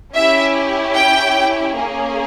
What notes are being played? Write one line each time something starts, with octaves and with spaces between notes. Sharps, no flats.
C#4 E4 G4 E5
G5
A#3 C#4 G#4